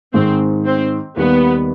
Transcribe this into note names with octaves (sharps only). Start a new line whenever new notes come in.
G#2 D#3 G#3 C4
C4
D#2 D#3 G3 B3